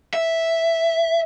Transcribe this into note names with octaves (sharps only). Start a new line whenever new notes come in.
E5